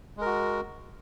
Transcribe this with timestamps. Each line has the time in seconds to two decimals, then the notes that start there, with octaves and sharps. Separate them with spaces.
0.17 G#3
0.21 A#4
0.26 F#4